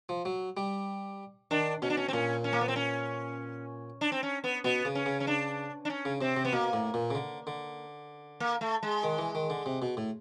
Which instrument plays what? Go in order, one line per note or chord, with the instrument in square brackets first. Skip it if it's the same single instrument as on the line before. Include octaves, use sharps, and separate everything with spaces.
[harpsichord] F3
F#3
G3
[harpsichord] D#3 [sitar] D4
[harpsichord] B2 [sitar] C#4
[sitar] D4
C#4
C4
[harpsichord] A#2 [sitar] C#4
[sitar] C#4
A#3
B3
C4
C#4
D4
C4
C#4
B3
[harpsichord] B2 [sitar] B3
[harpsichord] C#3
[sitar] C#4
[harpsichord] C#3
[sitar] C#4
D4
D4
C#4
[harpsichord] C#3
[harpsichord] C3 [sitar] C4
[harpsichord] C3
[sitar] B3
[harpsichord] B2 [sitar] A#3
[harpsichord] A2
A#2
C#3
D3
D3
[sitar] A#3
A3
G#3
[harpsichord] D#3
E3
D#3
D3
C3
B2
A2